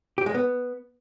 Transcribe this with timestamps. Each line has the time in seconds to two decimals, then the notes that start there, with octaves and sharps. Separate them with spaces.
0.18 G4
0.26 G#3
0.34 B3